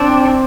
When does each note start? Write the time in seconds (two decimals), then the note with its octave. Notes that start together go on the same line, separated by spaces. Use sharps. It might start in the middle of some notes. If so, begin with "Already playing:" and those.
Already playing: C4 D4